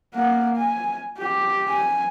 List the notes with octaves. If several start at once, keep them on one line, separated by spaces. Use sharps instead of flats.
A#3 F#5
G#5
G4
G#5